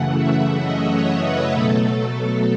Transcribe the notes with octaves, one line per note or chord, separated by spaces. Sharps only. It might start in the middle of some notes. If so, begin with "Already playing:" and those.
Already playing: F#2 C#3 E3 A3 F#5
E5
D#5
C#5
B4
B2 F#3 A3 A4